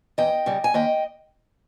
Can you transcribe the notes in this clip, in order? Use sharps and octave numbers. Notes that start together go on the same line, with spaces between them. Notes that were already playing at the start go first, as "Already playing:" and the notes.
E2 D#5 G5
C#3 G3
G#5
D#2 D#5 G5